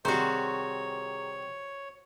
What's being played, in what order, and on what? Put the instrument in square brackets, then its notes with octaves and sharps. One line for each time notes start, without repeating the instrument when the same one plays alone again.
[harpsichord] C3 D#3 G3 [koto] F#4 C5 [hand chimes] G#4 A#5 [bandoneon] C#5